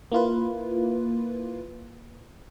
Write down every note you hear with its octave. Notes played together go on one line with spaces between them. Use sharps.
A#3 E4 F4 B4